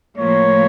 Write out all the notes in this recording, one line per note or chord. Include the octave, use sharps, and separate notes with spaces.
A2 F3 A#3 C#5